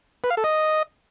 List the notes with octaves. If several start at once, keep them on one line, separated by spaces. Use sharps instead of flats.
B4
F5
A4
D#5